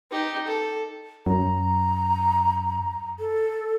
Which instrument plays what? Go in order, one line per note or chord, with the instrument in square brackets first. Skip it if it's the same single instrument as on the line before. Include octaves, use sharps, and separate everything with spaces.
[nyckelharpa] D#4 G4
A4
[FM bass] F#2 [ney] A#5
[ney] A4